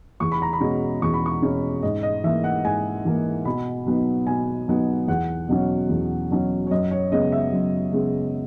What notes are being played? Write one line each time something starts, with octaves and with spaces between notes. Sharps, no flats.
E2 C#6
B5
A#5
B5
B2 G#3 C#4
E2 C#6
B5
C#6
B2 G#3 C#4
G#2 D#5
D#5
E3 A#3 E5
F#5
G#2 G#5
E3 A#3
B2 B5
F#3 B3 D#4
B2 G#5
F#3 B3 D#4
E2 F#5
B2 F#3 C#4
E2
B2 F#3 C#4
C#5
F#2 D#5
C#5
C#3 G#3 B3 D#5
E5
F#2
C#3 G#3 B3